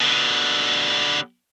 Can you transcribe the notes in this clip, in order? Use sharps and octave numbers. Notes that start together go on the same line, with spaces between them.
B2 D3